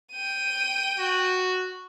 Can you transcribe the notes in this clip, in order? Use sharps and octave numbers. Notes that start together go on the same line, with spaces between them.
G5 D#7
F#4